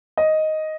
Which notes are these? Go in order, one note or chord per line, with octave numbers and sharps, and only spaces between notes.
D#5